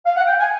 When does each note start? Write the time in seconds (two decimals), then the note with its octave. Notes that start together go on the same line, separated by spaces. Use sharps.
0.05 F5
0.16 F#5
0.27 G5
0.39 G#5